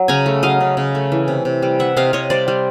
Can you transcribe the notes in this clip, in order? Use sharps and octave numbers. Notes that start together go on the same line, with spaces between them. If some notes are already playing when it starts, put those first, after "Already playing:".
Already playing: F#3
C#3 G#5 A#5
A3
F#3 D#5 F5
C#3
C#3
A3
E3
C3
C3
G3
E3 E5 F#5
C3 D#5 F5
C3 C#5 D#5
G3 C5 D5
G3